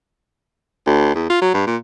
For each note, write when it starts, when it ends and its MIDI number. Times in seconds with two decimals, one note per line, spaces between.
0.86 1.13 38
1.15 1.27 40
1.30 1.38 65
1.41 1.51 54
1.54 1.66 43
1.67 1.76 46